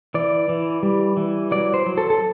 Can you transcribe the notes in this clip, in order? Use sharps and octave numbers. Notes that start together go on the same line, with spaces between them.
E3 D5
E3
G3
E3
F#3 D5
C5
F#3
A4
A4